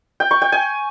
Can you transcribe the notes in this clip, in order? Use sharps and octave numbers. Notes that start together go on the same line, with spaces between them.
G5
C#6
G5
G#5